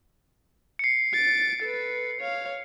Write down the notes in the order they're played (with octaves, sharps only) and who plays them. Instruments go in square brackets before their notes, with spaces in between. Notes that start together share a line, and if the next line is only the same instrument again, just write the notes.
[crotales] C7 C#7
[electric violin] A6 D7
A4 B4
C#5 F5